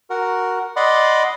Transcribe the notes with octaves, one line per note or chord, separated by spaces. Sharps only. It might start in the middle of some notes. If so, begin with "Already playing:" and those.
F#4 A#4 F#5
D5 D#5 F#5 B5 C6 D6